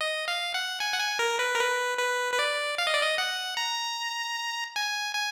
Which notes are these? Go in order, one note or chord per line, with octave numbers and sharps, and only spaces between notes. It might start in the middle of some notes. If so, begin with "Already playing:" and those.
D#5
F5
F#5
G#5
F#5
G#5
A#4
B4
A#4
B4
B4
B4
D5
F5
D#5
D5
D#5
F#5
A#5
G#5
G#5